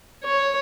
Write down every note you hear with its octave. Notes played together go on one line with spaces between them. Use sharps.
C#5